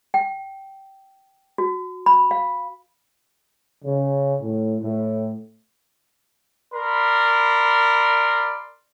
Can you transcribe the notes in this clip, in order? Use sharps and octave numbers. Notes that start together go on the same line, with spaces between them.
G5
F#4
B5
F5
C#3
A2
A2
A#4 D5 B5 C6